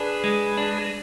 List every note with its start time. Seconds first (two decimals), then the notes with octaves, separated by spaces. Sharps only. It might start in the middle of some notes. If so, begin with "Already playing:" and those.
Already playing: D4 G#4 B4
0.24 G#3
0.57 D4